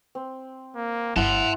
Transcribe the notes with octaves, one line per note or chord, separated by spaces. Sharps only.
C4
A#3
G1 E4 E5 F#5 A5 C6